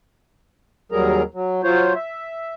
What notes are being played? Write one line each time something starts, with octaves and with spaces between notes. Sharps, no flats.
D#2 F#3 G3 G#4 A#4 A#5
F#3
F#3 F4 C5 C#5
E5